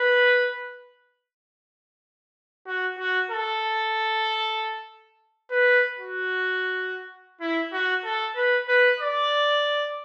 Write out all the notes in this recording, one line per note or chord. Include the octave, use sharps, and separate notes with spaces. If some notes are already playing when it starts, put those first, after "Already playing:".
Already playing: B4
F#4
F#4
A4
B4
F#4
E4
F#4
A4
B4
B4
D5